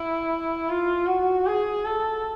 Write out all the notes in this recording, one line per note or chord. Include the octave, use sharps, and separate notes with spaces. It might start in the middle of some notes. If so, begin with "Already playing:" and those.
Already playing: E4
F4
F#4
G#4
A4